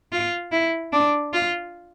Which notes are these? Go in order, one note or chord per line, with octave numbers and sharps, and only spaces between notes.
F4
E4
D4
F4